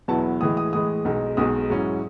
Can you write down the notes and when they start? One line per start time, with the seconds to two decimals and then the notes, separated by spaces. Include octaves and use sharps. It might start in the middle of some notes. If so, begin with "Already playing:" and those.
0.08 E2 B2 F#3 B3 E4 A5
0.41 A2 E3 G#3 D#6
0.57 D#6
0.73 A2 E3 G#3 D#6
1.05 B1 B2 G#3 D#4
1.37 B1 B2 G#3 D#4 D#6
1.70 G#2 F#3 C#4 E4